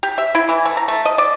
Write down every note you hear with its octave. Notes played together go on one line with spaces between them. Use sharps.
G4
E5
E4
E3
A3
A#5
A3
D#5
D5